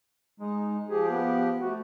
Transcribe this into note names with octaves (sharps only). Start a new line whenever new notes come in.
G#3 D#4
F3 G4 G#4
B3
A3 F#4